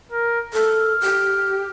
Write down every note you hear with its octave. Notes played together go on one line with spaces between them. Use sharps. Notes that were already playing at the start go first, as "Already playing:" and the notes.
A#4
A4 F6
G4